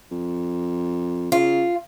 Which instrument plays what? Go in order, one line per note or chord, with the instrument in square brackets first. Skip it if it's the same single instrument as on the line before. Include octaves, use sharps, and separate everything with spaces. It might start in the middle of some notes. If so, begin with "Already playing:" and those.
[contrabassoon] F2
[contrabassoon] C#3 [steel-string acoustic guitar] F4